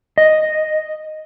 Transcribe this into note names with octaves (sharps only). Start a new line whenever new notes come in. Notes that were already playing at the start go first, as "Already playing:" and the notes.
D#5